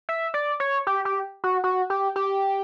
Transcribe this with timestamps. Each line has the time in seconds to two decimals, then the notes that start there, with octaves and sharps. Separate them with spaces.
0.09 E5
0.34 D5
0.60 C#5
0.87 G4
1.05 G4
1.44 F#4
1.64 F#4
1.90 G4
2.16 G4